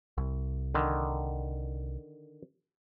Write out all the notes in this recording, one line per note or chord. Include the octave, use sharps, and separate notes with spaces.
C2
D3 D#3